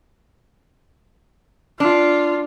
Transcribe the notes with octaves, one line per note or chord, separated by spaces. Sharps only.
D4 F4